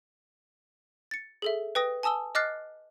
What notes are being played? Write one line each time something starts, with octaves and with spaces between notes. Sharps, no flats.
A6 C#7
G#4 A4 E5
B4 G5 D#6 A#6
G#5 A5 D#6 E6 G7
D#5 D6 F6 F#6 A6 C7